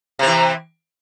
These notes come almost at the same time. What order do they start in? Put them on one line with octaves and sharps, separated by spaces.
C3 C4 E3